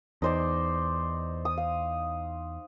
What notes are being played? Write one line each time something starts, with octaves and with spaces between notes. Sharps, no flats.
E2 D#4 C5 D5
D#6
F5